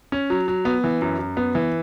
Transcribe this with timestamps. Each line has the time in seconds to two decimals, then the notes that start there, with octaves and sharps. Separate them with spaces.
0.12 C#4
0.30 F#3
0.48 F#3
0.65 B3
0.84 E3
1.02 F#2
1.19 F#2
1.37 B3
1.55 E3